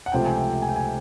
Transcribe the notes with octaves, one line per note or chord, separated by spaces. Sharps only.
F#5
C#2 C3 F3 A3 C4 G5
G#5
G5
G#5
G5
G#5